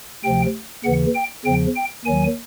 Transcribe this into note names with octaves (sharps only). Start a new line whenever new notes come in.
D2 C3 F3 G5
D#2 C#3 E3 F#5
G5
E2 C#3 F3 G5
G5
D#2 D#3 F#3 G#5